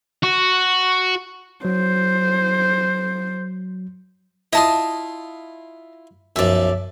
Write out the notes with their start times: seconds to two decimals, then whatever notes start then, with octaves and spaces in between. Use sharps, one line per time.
0.23 F#4
1.65 F#3 C5
4.53 E4 F4 D#5 A5 D#6
6.36 B1 F#2 F3 D5 E5